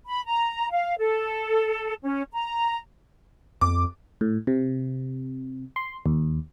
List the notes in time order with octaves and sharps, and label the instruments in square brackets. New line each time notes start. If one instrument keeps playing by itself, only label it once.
[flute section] B5
A#5
F5
A4
C#4
A#5
[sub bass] F2 [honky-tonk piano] D6
[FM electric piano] A2
C3
C6
D#2